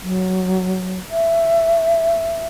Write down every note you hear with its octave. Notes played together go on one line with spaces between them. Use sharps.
F#3
E5